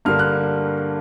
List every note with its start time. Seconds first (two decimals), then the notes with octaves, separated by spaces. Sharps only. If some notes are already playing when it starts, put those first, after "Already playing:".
0.05 G2 D3 G3 A#3 F6
0.19 F#6